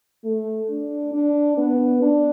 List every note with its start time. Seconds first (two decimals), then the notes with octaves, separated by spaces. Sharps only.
0.25 A3
0.69 D4
1.13 D4
1.57 B3
2.02 D4